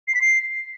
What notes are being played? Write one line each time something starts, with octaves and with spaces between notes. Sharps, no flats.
C7
B6
C7